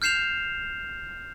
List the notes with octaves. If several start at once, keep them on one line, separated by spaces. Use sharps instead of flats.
F6 G6 C7 E7 F7